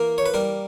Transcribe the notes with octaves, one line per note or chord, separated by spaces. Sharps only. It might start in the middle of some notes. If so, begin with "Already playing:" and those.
Already playing: E3 A#3 A#4
C#5
B4
G3 A#4